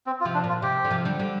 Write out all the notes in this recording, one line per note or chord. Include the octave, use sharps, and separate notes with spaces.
C4
F4
C3 F3
D4
A#2 F4
C3 G4
D3
C3 F3
D3 G3
D3 G3